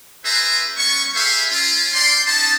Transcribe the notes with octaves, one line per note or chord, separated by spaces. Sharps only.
C#4 G#4 B4 C5 E5 A#5
G3 B3 C#4 C#6
G4 G#4 B4 C5 E5 F5
C#4 F4
C#4 D5 G5 C6
C#4 D#4 A5